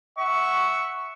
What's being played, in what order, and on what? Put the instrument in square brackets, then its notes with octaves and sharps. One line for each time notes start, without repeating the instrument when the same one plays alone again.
[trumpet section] E5 F#5 C#6